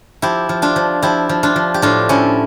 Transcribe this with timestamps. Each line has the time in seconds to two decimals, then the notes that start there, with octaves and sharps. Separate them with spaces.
0.22 F3 E4 G4
0.49 F3
0.62 D4 F4
0.76 F3
1.02 F3 E4 G4
1.29 F3
1.43 D4 F4
1.56 F3
1.74 G4
1.82 A2 D4 F4
2.09 F3 C#4 E4